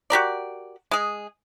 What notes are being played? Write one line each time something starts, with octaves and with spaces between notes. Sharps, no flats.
F#4 G4 A#4 D5
G#3 G#4